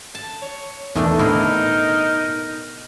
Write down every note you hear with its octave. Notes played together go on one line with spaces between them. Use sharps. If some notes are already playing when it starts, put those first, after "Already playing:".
A5
C#5
E2 B2 D#3 A3 D4 D#4 G#5
A2 D3 C4 E4 G#4 A#4